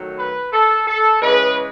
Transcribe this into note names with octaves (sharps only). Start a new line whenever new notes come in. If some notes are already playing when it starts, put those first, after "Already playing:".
Already playing: D#3 F#3 A3
B4
A4
A4
C#3 E3 G#3 B4